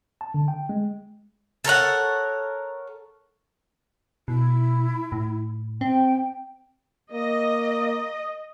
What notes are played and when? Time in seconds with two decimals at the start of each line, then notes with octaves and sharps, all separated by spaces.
0.21 A5
0.34 D3
0.48 G5
0.69 G#3
1.64 A4 A#4 C#5 F#5
4.28 B2 E4
5.12 A2
5.81 C4 G5
7.13 A#3 D#5